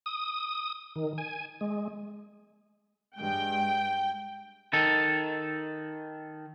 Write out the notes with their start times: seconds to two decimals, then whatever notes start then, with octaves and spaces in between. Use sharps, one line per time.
0.06 D#6
0.96 D#3
1.18 G#5
1.61 G#3
3.18 G2 G#3 G5
4.73 D#3 A4